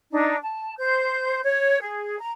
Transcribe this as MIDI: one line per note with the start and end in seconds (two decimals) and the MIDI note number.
0.12 0.37 62
0.12 0.37 63
0.41 0.74 81
0.78 1.40 72
0.78 1.40 91
1.43 1.80 73
1.80 2.17 68
2.19 2.31 82